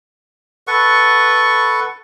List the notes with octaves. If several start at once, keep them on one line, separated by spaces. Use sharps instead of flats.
A4 B4 F#5 C#6